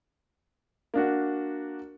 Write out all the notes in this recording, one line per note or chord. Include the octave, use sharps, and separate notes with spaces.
A#3 D4 F#4